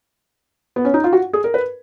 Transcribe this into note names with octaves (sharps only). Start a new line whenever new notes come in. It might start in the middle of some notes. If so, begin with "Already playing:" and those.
B3
C#4
D#4
F4
F#4
G#4
A#4
B4